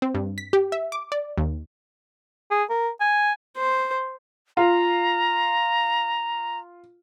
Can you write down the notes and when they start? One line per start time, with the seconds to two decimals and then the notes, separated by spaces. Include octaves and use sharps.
0.02 C4
0.15 G2
0.38 B6
0.53 G4
0.72 E5
0.92 D6
1.12 D5
1.38 D#2
2.51 G#4
2.70 A#4
3.00 G#5
3.57 C5
4.57 F4 A#5